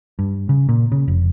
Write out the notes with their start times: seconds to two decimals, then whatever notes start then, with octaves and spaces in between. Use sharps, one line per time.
0.19 G2
0.49 C#3
0.69 A#2
0.92 C#3
1.08 F1